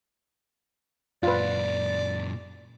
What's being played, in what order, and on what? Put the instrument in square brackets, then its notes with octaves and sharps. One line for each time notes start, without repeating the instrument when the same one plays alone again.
[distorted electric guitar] F#2 A#2 [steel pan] F4 B4 [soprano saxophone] D5